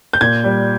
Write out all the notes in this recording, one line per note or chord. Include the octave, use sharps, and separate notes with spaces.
G6
A#2 G#6
G3